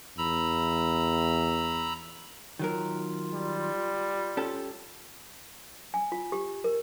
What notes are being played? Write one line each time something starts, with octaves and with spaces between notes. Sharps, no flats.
E2 A#5 B5 E6
D#3 F#3 F4 A#4
G3
C#4 G4 A4
G#5
F4
G4
A#4